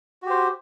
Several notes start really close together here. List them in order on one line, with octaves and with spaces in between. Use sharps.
F#4 G4 C5